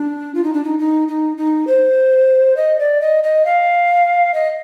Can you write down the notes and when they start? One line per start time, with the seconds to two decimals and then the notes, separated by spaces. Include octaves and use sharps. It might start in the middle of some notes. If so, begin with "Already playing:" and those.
Already playing: D4
0.35 F4
0.44 D#4
0.54 D4
0.64 D#4
0.79 D#4
1.08 D#4
1.38 D#4
1.67 C5
2.57 D#5
2.79 D5
3.01 D#5
3.23 D#5
3.45 F5
4.34 D#5